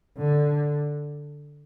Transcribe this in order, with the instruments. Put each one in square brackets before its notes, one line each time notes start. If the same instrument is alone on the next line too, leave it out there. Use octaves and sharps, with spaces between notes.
[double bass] D3